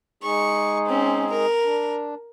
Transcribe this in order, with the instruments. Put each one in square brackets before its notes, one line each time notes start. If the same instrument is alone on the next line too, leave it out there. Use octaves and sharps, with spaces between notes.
[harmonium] G#3 D#4 G#4 [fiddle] C#6
[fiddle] C4 C#4
A#4
[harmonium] D4